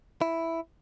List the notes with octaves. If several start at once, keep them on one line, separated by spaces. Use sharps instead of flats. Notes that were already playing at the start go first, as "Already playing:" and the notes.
E4